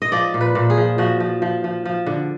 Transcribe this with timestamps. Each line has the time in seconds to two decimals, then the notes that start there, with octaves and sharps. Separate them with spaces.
0.02 D#5
0.12 F3 D5
0.34 A#2
0.41 B4
0.55 A#2
0.70 G#4
0.77 F3
0.98 F3 F#4
1.20 F3
1.42 F3
1.64 F3
1.85 F3
2.06 D3